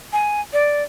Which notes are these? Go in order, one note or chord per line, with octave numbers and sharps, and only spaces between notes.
G#5
D5